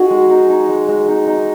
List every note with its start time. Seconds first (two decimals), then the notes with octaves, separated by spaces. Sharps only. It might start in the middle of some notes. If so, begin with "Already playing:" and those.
Already playing: D#4 F#4 G#4
0.11 G#3
0.30 D#4
0.50 D#4
0.69 G#3
0.89 G#3
1.08 D#4
1.27 D#4